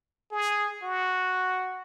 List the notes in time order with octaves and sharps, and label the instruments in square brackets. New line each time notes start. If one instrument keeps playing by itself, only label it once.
[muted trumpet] G#4
F#4